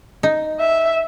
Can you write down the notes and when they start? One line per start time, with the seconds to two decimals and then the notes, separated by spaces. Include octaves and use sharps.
0.23 D#4
0.60 E5